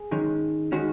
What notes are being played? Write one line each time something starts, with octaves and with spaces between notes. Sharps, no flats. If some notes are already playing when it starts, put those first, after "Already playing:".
Already playing: G#4
G#2 D#3 G#3 C#4
D#3 G#3 C#4 F#4